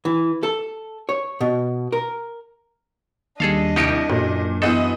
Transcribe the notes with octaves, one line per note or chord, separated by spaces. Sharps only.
E3
A4
C#5
B2
A#4
D#2 G3 D4 G#4 A4 D#5 F5
C2 D#4 G4 C#7 D7
A1 F#2 A#2 F#3
E3 B3 C4 A4 D#5